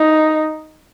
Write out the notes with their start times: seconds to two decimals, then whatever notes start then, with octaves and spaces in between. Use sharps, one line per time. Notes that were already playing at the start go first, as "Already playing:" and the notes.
Already playing: D#4